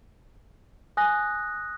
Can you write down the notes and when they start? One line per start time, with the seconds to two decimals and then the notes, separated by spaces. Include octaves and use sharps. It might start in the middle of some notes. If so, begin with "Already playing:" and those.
0.97 G#5 D#6 F#6 A#6